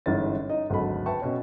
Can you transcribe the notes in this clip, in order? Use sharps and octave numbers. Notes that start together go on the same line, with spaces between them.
G1 G#2 E3 C#4 A6
D#4 D#5
G#1 D2 F#3 F#4 A4 B5
B4 E5 G5 A5 C#6
B2 C#4